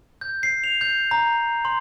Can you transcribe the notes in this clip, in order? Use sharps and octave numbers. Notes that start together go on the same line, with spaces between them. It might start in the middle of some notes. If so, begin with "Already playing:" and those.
G6
C7
F7
G6
A#5
C6